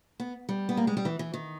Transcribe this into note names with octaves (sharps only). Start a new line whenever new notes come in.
B3
G3
B3
A#3
G#3
G3
E3
E3
D#3